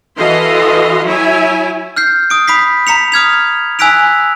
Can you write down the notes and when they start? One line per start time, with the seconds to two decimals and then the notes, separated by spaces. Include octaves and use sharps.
0.18 E3 F#4 A4 D#5 F5 C6
1.04 F#3 E4 C#5 E5 G#5
1.96 F6 G6 C7
2.30 D#6 D7
2.47 B5 D#6 B6 C7
2.87 A#5 B6 C#7 F7
3.12 D#6 F6 G#6 F7
3.79 G#5 E6 F#6 B6 D7 F7